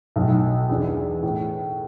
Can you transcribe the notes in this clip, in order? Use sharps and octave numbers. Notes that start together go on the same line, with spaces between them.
B1 A2 F#3
E2 E3 D4
A2